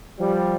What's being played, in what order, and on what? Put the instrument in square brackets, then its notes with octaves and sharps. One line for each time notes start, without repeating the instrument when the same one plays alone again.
[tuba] F3 [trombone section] G3